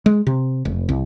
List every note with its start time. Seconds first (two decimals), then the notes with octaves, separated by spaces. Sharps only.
0.06 G#3
0.27 C3
0.65 F1
0.89 C2